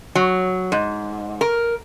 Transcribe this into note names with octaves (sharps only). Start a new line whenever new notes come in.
F#3
G#2
A#4